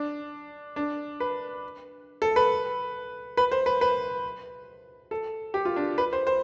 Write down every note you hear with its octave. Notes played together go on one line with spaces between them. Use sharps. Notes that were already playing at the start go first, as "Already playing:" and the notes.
Already playing: D4
D4
B4
A4
B4
B4
C5
B4
B4
A4
G4
F4
D4
B4
C5
C5